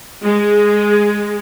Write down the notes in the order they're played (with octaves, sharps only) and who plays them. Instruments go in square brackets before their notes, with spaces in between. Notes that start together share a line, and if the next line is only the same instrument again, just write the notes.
[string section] G#3